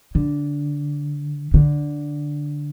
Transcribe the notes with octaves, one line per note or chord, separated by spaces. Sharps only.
D3
D3